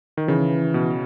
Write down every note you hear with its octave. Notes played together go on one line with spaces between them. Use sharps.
D#3
C#3 E3
B2